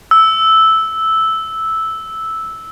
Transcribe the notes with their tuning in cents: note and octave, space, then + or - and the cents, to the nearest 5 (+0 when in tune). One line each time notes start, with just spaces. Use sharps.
E6 -5